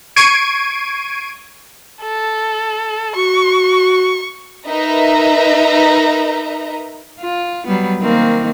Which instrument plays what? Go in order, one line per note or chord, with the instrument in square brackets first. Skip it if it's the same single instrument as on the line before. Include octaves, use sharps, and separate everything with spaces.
[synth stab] C#6 G#6 C7 D7 D#7
[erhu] A4
[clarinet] F#4 [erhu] C#6
[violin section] D#4 A#4 B4 D#5 E5 A#5
[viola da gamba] F4
F#3 G3 B3
D#3 A#3 C4